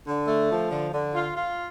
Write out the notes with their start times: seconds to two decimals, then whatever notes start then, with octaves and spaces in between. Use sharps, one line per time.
0.06 D3
0.27 A3
0.49 F3
0.71 D3
0.93 D3
1.14 F4
1.37 F4